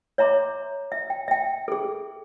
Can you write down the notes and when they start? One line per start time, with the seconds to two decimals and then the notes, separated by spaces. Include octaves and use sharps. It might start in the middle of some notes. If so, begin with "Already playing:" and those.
0.18 C#5 E5 A#5 C6 D6
0.92 E5
1.10 G5
1.28 E5 G5
1.68 G#4 A4